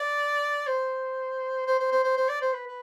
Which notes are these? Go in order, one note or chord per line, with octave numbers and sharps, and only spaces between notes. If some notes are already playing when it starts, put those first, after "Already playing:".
Already playing: D5
C5
C5
C5
C5
C5
C5
D5
C5
B4
B4